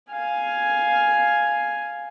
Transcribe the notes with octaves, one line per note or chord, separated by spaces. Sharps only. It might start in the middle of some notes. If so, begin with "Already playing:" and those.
F5 G#5